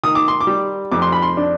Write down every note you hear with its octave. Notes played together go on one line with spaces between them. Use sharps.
D#3 D#6
D6
C6
D6
G3
F2 D6
C6
B5
C6
D4